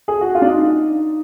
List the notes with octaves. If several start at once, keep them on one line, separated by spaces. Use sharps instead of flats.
G#4
F#4
F4
D4
D#4